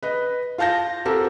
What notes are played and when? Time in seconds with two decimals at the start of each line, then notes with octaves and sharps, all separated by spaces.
0.03 B4 D#5
0.58 F4 F5 A5 G6 A#6
1.05 C4 F#4 G4 A4 A#4 C5